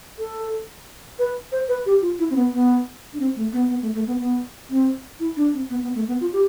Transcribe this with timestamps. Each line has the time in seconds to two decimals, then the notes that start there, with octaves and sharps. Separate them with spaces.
0.19 A4
1.19 B4
1.52 C5
1.68 B4
1.86 G4
2.02 F4
2.19 E4
2.30 C4
2.36 B3
2.52 B3
3.14 D4
3.20 C4
3.36 A3
3.53 B3
3.69 B3
3.82 A3
3.95 A3
4.07 B3
4.20 B3
4.70 C4
5.20 E4
5.37 D4
5.53 C4
5.70 B3
5.83 B3
5.95 A3
6.08 B3
6.21 F4
6.33 G4